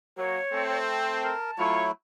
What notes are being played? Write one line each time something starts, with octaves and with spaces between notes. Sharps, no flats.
F#3 A#3 C#5
A3 C4
A5
A#4
F#3 A3 E4 F4 C#5